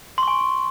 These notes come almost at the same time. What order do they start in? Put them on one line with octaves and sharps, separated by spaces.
C6 C#6 G#5